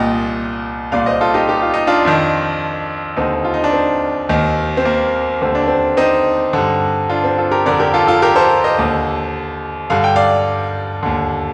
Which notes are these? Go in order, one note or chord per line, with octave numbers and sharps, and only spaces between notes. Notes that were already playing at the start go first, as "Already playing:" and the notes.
Already playing: C2 A#2 D#5 G5
C2 A#2 D5 F5
C5 D#5
F4 A4
D#4 G4
G4
F4
D#4
D4 F4
F2 D#3
D#2 D3 C4 D#4
F4
D#4
D4
C4
D#2 D#3
C4
A#3
D#2 D3 C4
D4
C4
C4 D#4
G2 D3
D4 F4
C4
F4 A4
G4 A#4
F2 D3 A#4 D5
G4 A#4
F4 A4
F4 A4
G4 A#4
A4 C5
C5 D#5
D#2 D3
G2 D3 F5
G5
D5 F5
D#2 D3